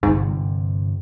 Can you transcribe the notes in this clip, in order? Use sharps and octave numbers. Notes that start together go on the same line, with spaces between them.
G1 G#2 C3